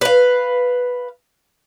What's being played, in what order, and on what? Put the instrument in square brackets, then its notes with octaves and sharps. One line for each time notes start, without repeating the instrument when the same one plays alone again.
[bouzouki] B4 F5